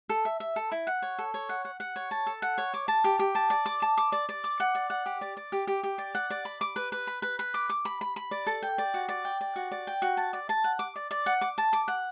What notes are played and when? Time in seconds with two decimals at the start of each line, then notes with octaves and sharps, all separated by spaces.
0.09 A4
0.25 E5
0.40 E5
0.56 A4
0.72 E4
0.87 F#5
1.02 C#5
1.18 A4
1.34 C#5
1.49 F#5
1.65 F#5
1.80 F#5
1.96 C#5
2.11 A5
2.27 A4
2.42 F#5
2.58 C#5
2.74 D6
2.88 A5
3.04 G4
3.19 G4
3.35 A5
3.50 D5
3.66 D6
3.82 A5
3.97 D6
4.12 D5
4.29 D5
4.44 D6
4.60 F#5
4.75 D5
4.90 F#5
5.06 G4
5.21 D5
5.37 D5
5.52 G4
5.67 G4
5.83 G4
5.98 D5
6.15 F#5
6.30 D5
6.45 B5
6.61 D6
6.76 B4
6.92 B4
7.07 B5
7.22 B4
7.39 B4
7.54 D6
7.69 D6
7.85 B5
8.01 B5
8.16 B5
8.31 D5
8.47 A4
8.62 G5
8.78 D5
8.94 F#4
9.09 D5
9.25 G5
9.41 D5
9.56 F#4
9.72 D5
9.87 G5
10.02 F#4
10.17 A5
10.33 D5
10.49 A5
10.64 F#5
10.79 D6
10.96 D5
11.11 D5
11.26 F#5
11.41 D6
11.58 A5
11.73 D6
11.88 F#5